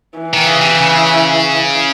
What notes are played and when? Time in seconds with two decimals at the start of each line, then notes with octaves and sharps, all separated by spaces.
0.19 E3
0.34 D#3
0.46 C#3
0.61 C3
0.75 C#3